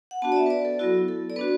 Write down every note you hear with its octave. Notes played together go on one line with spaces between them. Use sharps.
F#5
B3 D4 F#4 A5
D5
E5
B4
D5
A4
F#3 B3 E4 F#4
A4
D5
B3 D4 F#4 B4